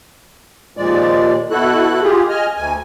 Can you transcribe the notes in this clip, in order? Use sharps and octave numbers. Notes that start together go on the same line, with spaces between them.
D#2 A#2 F3 G#3 D5
B2 E4 F#4 A4 F#6
F4 G4 G#4
D#5 G#5 F6
D2 G#5